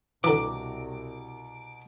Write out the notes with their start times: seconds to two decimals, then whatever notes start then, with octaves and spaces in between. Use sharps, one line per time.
0.24 C2 B2 D3 E3 F#4 A#5 D6